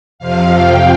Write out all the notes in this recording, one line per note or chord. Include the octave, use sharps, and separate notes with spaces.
F2 C3 F3 F5
G5